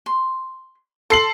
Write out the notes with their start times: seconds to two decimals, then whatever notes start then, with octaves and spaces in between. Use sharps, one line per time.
0.06 C6
1.10 A4 C6 C7 F#7